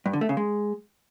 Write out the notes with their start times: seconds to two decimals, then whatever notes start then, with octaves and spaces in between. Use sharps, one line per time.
0.06 G2
0.13 D3
0.21 A3
0.29 C#3
0.37 G#3